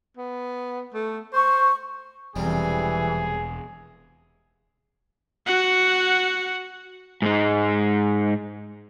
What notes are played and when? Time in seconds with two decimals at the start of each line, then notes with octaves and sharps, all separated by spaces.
0.17 B3
0.94 A3
1.33 C5 C#6
2.36 E1 F2 C3 E3 G3 G#4
5.46 F#4 F#5
7.22 G#2 G#3